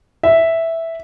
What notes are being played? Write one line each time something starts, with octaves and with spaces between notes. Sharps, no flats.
E5